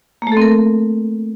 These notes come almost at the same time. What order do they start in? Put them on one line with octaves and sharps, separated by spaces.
A#3 A3 A4 C4 A#4